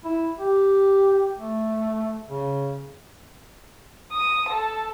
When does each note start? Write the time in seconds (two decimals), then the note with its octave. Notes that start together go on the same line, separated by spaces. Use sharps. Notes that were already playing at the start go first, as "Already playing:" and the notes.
0.04 E4
0.38 G4
1.39 A3
2.29 C#3
4.11 D#6
4.48 A4